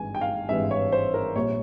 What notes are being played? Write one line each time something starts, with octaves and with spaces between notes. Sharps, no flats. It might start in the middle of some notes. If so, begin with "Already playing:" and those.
Already playing: G#1 G2 E3 G#3 G#5
G5
F5
G#1 G2 E3 G#3 E5
C#5
C5
A#4
A#1 A#2 G3 C#5